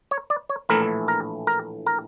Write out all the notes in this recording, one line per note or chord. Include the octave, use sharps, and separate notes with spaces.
C#5
D5
C#5
A#1 A2 E3 A3 E4 A#4
A#4
A#4
A#4